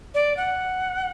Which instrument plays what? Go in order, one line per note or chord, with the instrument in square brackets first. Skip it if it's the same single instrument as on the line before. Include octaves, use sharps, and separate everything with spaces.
[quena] D5
F#5